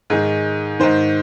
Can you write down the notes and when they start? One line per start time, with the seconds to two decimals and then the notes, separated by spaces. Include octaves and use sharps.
0.10 G#2 D#3 G#4
0.80 G#2 D#3 C5